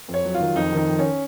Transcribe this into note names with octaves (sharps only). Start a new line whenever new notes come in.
F2
C#5
F#3
F4
D#3
F2 D#4
D#3 D#4
F2
C#4